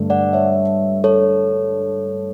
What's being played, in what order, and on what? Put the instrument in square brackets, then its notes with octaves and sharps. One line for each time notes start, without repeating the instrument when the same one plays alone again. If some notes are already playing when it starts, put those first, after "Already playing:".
Already playing: [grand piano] G2 D3 A3 D4
[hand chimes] D5 F#5
C#5 E5
A4 C#5